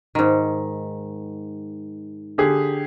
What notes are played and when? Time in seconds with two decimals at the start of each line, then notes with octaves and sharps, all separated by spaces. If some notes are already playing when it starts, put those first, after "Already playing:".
0.15 G#2 D#3
2.38 D3 G4 G#4